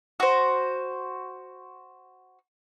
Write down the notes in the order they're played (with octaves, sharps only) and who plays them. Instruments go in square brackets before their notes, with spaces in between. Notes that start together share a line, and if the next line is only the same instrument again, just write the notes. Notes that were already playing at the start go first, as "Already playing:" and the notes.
[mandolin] F#4 C5